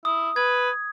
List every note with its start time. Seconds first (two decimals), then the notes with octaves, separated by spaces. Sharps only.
0.05 E4 D#6
0.36 B4 G#6